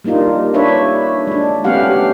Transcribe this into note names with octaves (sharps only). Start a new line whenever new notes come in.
G3 A#3 D4 D#4 F4
D4 B4 C#5 E5
G#3 D4
A3 B3 C#4 G4 F5 F#5